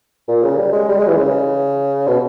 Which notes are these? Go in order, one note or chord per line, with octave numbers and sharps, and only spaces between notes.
A#2
C#3
G3
G#3
G3
G#3
E3
C#3
B2